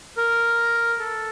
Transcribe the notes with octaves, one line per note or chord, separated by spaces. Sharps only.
A#4
A4